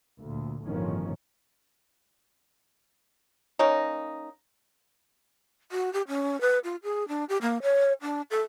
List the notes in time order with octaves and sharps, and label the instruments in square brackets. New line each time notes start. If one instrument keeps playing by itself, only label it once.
[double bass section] D2 A#2
G1 A2 D#3 F3 C#4
[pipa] A#3 C#4 D#4
[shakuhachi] F#4
G4
C#4
B4
F4
G#4
D4
G4
A#3
C#5
D4
A4